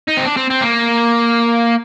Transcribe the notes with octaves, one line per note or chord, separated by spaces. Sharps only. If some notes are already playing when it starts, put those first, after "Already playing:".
D#4
C4
D4
C4
C4
A#3